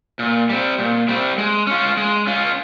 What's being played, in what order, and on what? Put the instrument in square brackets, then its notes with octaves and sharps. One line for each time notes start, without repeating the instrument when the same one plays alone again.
[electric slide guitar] A#2
G3 C4
A#2
G3 C4
G#3
C#4 F4
G#3
C#4 F4